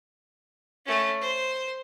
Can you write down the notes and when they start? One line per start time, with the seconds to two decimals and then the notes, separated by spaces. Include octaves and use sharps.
0.86 A3 C#4
1.22 C5